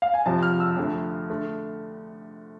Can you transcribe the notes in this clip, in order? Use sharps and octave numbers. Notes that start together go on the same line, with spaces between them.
F5
G#5
F2 C3 F3 A5
F6
E6
F2 D3 A3
D3 A3